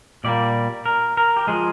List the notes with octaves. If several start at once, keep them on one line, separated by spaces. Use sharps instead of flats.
A#2 G3 A#3 D5
A#4
A#4
G4
F3 G#3 G#4